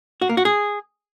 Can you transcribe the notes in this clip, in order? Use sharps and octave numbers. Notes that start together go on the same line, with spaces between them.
F#4
A#3
F#4
G#4